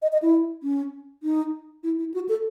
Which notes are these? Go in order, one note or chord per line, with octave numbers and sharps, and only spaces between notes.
D#5
D#5
E4
C#4
D#4
E4
E4
F#4
A4